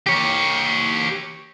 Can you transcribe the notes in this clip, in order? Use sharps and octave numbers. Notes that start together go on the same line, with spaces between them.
G4 C#5